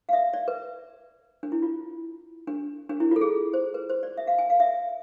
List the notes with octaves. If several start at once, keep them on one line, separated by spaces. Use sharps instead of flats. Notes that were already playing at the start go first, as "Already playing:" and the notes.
F5
E5
D5
B4
D4
E4
F4
D4
D4
E4
F4 A4
G#4
C5
B4
C5
D5
E5
F5
G#5
F5
E5